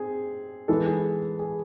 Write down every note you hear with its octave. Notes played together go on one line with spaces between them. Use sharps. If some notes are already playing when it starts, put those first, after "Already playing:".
Already playing: C4 G#4
E3 G#3 B3 A4
G#4
G#4